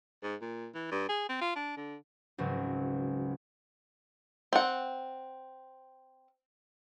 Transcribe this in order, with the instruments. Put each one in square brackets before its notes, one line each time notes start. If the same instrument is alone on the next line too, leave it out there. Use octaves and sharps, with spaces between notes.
[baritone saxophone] G#2
A#2
E3
G2
G#4
C4
F4
D4
D3
[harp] G#1 C#2 F#3
[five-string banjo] C4 F#5